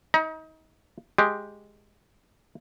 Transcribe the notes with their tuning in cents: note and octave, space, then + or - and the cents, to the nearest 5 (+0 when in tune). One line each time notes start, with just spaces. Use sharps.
D#4 +30 A#5 +40
G#3 +0 G4 +0